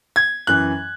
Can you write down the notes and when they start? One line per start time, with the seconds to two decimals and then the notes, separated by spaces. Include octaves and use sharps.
0.16 G#6
0.47 F#2 E3 F#6